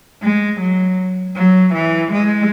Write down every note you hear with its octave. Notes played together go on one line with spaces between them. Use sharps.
G#3
F#3
F#3
E3
G#3